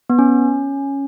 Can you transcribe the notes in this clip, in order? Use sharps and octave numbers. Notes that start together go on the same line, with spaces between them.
B3
C#4